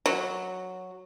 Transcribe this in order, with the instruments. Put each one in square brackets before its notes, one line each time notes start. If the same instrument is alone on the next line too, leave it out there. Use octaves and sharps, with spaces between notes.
[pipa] F#3